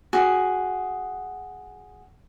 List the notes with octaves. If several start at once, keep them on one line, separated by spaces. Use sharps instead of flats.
F#4 G#4